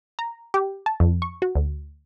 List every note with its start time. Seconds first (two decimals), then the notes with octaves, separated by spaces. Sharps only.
0.19 A#5
0.54 G4
0.86 A5
1.00 F2
1.22 C#6
1.42 F#4
1.55 D2